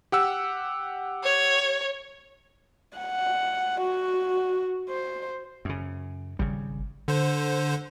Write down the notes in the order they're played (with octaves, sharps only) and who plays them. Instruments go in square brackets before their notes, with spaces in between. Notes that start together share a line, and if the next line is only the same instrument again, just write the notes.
[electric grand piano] G4 F#5 E6
[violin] C#5
[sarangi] F#5
F#4
C5
[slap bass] F#2 C#3
[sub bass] G#1 [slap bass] C#3 G3
[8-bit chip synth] D3 C5